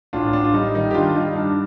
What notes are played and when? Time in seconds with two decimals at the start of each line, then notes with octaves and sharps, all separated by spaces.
0.13 A1 D4 F4
0.33 A1 D4
0.45 F4
0.54 G3 D#4
0.75 D#3 D#4
0.91 G4
0.94 G2 D4 F4
1.16 G2 D#4
1.35 G2 D4